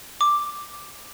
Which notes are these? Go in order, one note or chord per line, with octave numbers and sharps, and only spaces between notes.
D6